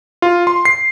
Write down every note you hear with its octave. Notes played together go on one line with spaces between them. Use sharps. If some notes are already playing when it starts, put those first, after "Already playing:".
F4
C6
C7